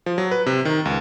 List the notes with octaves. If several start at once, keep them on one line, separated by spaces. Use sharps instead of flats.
F3
F#3
B4
C3
D#3
C#2